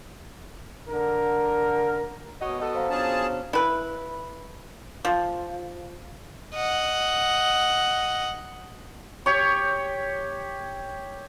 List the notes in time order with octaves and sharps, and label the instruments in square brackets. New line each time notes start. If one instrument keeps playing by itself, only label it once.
[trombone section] D3 A#4
[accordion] B2 [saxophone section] F#4 C#5 D#5
[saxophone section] F#4 A4 D#5
[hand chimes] C5 F5 A#5
[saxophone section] B2 C#4 D4 [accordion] F3 G#4 A5
[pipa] E4 B4
F3
[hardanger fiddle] D#5 F#5
[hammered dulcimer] G4 C#5